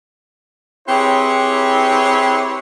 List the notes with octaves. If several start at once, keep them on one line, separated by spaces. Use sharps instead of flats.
C4 E4 G4 G#4 B4 C#5